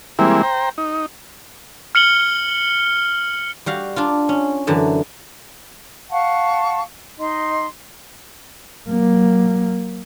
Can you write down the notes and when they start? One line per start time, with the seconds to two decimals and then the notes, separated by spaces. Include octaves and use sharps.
0.19 E3 G3 G#3 A#3 C4 E4
0.43 C5 G5 A#5
0.78 D#4
1.95 F6 C#7 F#7 G7
3.66 G3 F#4 F5
3.96 D4 F4
4.29 C#4
4.67 F#2 D3 E3 A5
6.10 F5 F#5 A5 C#6
7.20 D#4 D#5 C6
8.90 F#3 A#3